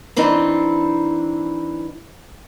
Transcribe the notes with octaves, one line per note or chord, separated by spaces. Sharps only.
E3 C4 D4 D#4